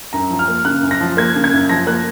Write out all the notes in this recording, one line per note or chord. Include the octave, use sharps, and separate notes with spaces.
F#2 A#5
F3
F6
A#3
C#3 F#6
F#2
A#6
F3
A#3 G#6
C#3
G#6
F#2
F3 A#6
A#3 F#6